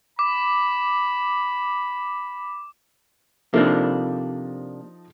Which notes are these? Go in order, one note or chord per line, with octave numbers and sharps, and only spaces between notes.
B5 D6
C3 F3 A#3 D4 D#4 A4